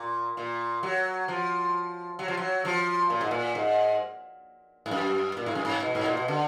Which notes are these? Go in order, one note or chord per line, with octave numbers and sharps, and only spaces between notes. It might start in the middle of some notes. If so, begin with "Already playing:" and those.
Already playing: A#2
A#2
F#3
F3
F#3
F3
F#3
F3
A#2
G#2
A#2
G#2
G#2
F#2
A#2
G#2
F#2
G#2
B2
G#2
A#2
B2
D3